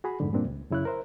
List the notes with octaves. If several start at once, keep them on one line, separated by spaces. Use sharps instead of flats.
F#4 G#4 B5
F2 G#2 D3
G2 A#2 A#3 C4 D4
C#2
F#2 C#3 E4 C#5 F#6
A#4 C5 E5